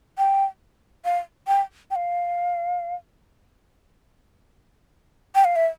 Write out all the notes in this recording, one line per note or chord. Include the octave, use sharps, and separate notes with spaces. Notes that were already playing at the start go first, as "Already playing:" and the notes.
G5
F5
G5
G5
F5
G5
F5
E5